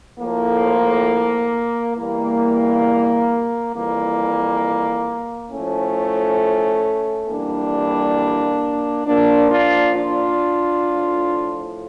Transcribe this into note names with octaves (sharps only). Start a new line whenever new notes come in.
A2 F3 A#3
E2 E3 G3 A#3
F2 E3 G3 A#3
A2 F3 A3 C#4
F2 E3 G3 A#3 D4
A#2 F3 A#3 D4
D4 F4
D4 F4
A2 F3